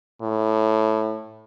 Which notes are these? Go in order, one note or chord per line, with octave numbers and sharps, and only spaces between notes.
A2